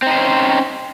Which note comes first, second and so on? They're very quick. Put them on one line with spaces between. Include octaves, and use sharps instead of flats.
C4 D#4 C5 C#4